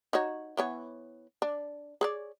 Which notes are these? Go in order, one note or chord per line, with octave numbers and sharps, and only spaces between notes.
D#4 F#4 C#5
E3 B3 C#5
D4
G#4 C#5 D5